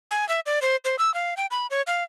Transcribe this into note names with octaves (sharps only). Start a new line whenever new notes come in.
G#5
E5
D5
C5
C5
E6
F5
G5
B5
C#5
F5